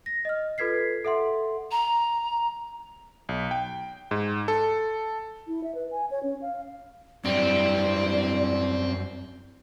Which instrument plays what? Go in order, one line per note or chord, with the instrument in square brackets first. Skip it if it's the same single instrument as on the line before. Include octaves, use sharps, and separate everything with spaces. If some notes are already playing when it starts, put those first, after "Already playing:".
[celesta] A#6
D#5 F6
F4 A4 B4 G#6 B6 C7
A4 E5 F#5 C6
[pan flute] A#5
[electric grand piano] B1
G5
G#2
A4
[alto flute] E4
E5
B4
G#5
C#5
C#4
F5
[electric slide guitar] F#2 G3 [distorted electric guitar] C4 [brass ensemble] E4 [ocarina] D5